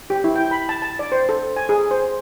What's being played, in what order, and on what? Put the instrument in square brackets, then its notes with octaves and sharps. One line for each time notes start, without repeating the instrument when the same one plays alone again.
[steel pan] G4
E4
G5
B5
A5
A5
D5
C5
A4
G#5
G#4
C5